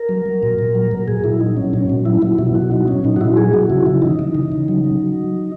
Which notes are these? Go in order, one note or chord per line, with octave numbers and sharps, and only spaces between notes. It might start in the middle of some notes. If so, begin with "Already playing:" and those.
Already playing: A#4
F#3
F#3
A#2
A#2
F#3
F#3
A#2 G#4
A#2 E4
F#3 D#4
F#3 C#4
A#2 C#4
A#2
F#3 E4
F#3 E4
B2 E4
B2 F#4
F#3 D#4
F#3 C#4
A#2 D#4
F#4
A#2 E4
F#3 G#4
F#3 F#4
C#3 E4
C#3 E4
E3 D#4
E3 D#4
C#3
C#3
F#3
F#3